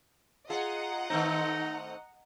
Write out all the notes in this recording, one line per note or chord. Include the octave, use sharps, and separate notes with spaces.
F4 G#4 D#5 F#5 A#5
D#3 A3 C4 D#4